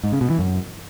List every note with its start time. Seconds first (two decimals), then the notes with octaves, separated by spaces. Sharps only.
0.04 G#2
0.12 C#3
0.21 B2
0.30 E3
0.39 F#2